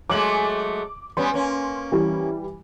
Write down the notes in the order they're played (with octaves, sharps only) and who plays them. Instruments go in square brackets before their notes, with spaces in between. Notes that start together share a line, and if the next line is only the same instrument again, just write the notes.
[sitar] F#3 G#3 A3 [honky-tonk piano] D6 F#7
[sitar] G3 B3 C#4 [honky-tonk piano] C6
[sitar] A#3 C#4
[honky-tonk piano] E3 G3